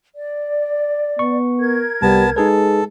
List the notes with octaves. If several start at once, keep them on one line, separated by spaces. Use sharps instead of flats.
D5
B3 C#6
A#4 G#6
C2 G3 B3 A5
G#3 D#4 G#4 A4 B4